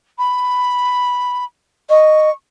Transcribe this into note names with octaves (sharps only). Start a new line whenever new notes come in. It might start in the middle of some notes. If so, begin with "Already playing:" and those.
B5
D#5 C#6